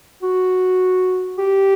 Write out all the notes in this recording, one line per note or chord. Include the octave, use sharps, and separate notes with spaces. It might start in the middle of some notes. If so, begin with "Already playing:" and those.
F#4
G4